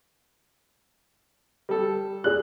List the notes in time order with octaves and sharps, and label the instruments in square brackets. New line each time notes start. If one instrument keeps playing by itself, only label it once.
[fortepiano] G3 A4
[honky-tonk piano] G#4 D5 F#6